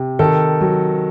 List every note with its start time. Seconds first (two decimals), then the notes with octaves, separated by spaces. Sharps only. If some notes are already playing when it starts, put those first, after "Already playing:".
Already playing: C3
0.19 D#3 A4
0.61 F#3